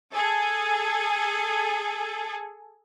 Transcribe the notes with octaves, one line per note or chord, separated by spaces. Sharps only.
G#4 A4